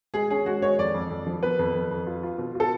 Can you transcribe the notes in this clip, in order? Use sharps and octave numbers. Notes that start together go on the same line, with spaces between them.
G#3 G#4
C#4 G#4
G#3 F#4
G#3 C#5
F2 D5
F2
F2
F3
B3 B4
F2
F2
F2
F4
F4
B2
F4 A4